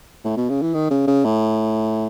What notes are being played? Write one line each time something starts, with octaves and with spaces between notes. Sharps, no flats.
A2
B2
C#3
E3
D#3
C#3
C#3
A2